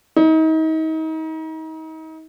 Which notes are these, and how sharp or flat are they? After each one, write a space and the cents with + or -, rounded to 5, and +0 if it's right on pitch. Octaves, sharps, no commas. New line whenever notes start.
D#4 +35